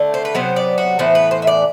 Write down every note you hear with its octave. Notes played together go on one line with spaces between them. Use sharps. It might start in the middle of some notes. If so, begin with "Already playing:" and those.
Already playing: D3 A3
C5
B4
C3 F#3 B3 C5
D5
F#4
A2 E3 B3 C5
B4
C5
E5
D5